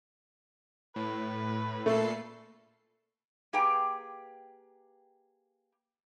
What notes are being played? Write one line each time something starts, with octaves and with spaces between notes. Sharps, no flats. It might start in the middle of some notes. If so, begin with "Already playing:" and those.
A2 B4
A#2 A3 A4 C7
A#3 G4 G#4 B4 G5 A#5